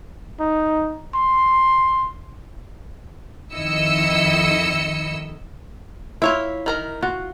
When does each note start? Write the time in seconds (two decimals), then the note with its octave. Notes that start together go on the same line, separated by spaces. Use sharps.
0.39 D#4
1.14 C6
3.54 F2 D#3 E4 D#5 E6 C#7
6.22 E4 F4 C#5 E5
6.66 D#3 A#4 A#5
7.03 F4 F#4